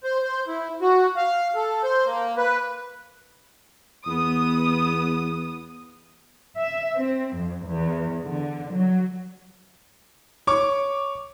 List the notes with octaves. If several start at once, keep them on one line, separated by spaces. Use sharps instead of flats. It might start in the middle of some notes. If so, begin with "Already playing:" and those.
C5
C5
E4
F#4
F5
A4
C5
A#3
B4
E2 B3 D#6
E5
C4
F2
E2
D3
F#3
C#5 C#6 D6